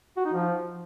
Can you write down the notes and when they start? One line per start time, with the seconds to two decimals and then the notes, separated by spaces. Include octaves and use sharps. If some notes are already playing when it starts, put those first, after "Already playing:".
0.17 F#4
0.25 D#4
0.33 F3